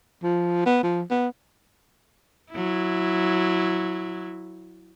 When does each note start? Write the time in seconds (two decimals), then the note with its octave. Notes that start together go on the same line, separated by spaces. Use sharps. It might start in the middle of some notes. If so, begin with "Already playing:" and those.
0.24 F3
0.66 B3
0.83 F3
1.11 B3
2.51 F#3 E4